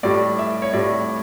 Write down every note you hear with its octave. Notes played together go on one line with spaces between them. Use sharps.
A2 G3 D5
E5
C#5
A2 G3 D5